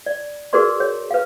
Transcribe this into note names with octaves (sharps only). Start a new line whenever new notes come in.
D5
F#4 G#4 A#4 B4 D5 C6
C#5
B4 F5